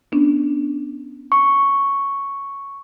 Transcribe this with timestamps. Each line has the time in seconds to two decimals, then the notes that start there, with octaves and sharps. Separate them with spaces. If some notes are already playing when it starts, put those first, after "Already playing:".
0.12 B3 C#4 D4
1.32 C#6